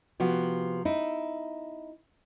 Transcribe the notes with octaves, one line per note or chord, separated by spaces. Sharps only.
C3 F3 B3 F#4
D#4 E4